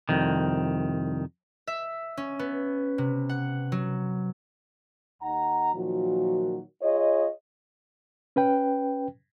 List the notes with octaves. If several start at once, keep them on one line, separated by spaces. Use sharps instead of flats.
C2 F2 D#3
E5
C#4
B3
C3
F#5
F#3
D#2 D#4 F#5 A#5
A#2 D#3 F3 F#3 F#4
F4 G#4 C#5 D#5
C#4 B4 G5